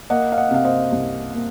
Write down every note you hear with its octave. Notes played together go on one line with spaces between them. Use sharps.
A#3 D#5 F#5
F5
D#5 F#5
C3 F5
C5 D#5
C2
A#3